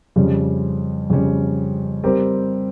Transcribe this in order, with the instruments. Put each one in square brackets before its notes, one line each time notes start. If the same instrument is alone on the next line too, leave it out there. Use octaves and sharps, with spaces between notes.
[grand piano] F2 C#3 G3 C#4 G4
F2 C#3 G3 C#4 G4
G3 C4 G4 A#4